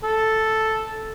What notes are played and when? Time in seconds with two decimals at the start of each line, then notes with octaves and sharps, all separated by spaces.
0.03 A4